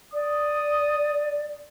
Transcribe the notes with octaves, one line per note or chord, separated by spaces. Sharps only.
D5 D#6